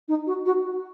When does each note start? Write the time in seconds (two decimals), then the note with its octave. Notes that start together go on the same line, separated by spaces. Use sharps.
0.08 D#4
0.27 F#4
0.46 F#4